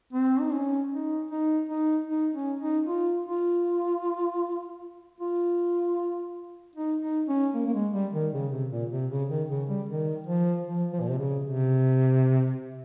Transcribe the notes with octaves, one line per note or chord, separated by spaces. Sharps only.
C4
D#4
C#4
D#4
D#4
D#4
D#4
C#4
D#4
F4
F4
F4
D#4
D#4
C#4
A#3
A#3
G#3
G3
D#3
C#3
C3
A#2
C3
C#3
D#3
C#3
G3
D#3
F3
F3
F3
A#2
C3
C#3
C3